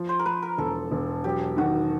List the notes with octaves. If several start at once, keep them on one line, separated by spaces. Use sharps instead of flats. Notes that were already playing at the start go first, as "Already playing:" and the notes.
Already playing: F3
C5
A#4
F3 B4
A#4
E1 A4
E1
F#3 G4
D#3 F#4